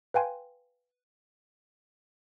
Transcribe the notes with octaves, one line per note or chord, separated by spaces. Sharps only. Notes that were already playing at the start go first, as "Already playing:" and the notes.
B4 F5 G5 G#5 C6